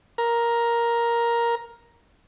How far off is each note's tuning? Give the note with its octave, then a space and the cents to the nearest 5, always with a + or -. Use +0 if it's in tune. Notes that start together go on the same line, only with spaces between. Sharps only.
A#4 +10